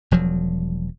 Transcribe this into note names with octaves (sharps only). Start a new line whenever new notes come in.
E1 F3 F#3